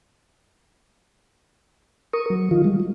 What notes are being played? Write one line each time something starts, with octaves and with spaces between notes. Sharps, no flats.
A#4 C#6 D#6
F#3
D#3 F3 F4
G3 G#3
F#3